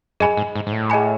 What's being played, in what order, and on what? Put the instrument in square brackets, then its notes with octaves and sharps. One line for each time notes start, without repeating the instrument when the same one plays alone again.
[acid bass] F#2 [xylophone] G#4 D#5 G#5 B5
[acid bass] G#2
G#2
G#2
A2
[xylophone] G#4 D#5 G#5 B5